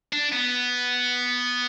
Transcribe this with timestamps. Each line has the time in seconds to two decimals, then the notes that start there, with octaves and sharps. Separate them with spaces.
0.13 D4
0.33 B3